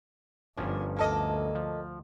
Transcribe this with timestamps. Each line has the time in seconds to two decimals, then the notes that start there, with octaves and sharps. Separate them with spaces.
0.57 G1 G2 A#2 F3 C#4
0.97 D2 A#3 A4 D#5
1.55 F3